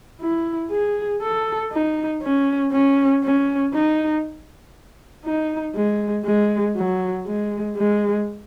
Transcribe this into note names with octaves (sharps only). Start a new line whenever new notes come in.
E4
G#4
A4
D#4
C#4
C#4
C#4
D#4
D#4
G#3
G#3
F#3
G#3
G#3